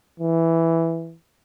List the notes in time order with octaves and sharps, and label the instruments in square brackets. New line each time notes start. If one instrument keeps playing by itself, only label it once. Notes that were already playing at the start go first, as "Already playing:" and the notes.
[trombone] E3